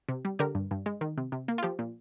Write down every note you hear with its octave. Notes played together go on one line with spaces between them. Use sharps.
C3
G3
D3 G4 A#4
G2
G2
G#3
D#3
C3
C3
A#3
F4
F3 G4
A#2